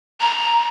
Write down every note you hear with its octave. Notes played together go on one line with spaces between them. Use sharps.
A#5